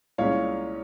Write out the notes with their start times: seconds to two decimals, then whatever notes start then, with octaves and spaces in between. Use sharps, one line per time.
0.18 C2 A#2 G#3 C#4 C#5 F5